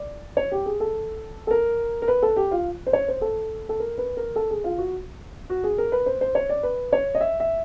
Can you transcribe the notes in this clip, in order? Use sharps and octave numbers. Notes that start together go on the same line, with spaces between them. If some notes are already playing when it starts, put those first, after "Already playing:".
Already playing: D5
C#5
G4
G#4
A4
A4
A#4
A#4
B4
A4
G4
F4
C5
C#5
C5
A4
A4
A#4
B4
A#4
A4
G#4
F4
F#4
F#4
G#4
A#4
B4
C5
C5
C#5
D5
B4
C#5
D#5
E5
E5